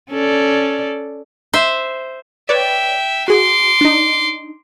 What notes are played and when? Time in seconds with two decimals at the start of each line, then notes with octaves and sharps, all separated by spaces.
0.11 C#4 A4 D5
1.53 C5 E5
2.49 B4 C#5 D5 E5 G5
3.28 F#4 G#4 C6 D6
3.81 D4 D#4